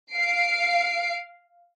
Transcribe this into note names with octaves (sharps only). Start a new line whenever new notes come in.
F5 C7 D7